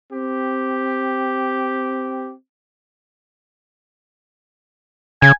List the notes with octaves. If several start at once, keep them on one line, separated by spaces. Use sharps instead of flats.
C4 G4
C#3 G#5